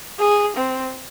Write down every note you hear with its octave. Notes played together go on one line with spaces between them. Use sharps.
G#4
C4